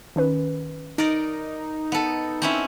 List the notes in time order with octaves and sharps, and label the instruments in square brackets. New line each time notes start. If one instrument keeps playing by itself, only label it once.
[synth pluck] D#3 C#4 B4
[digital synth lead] D#4 [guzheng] A#4 D5
[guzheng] B3 A4
C4 C#4 E4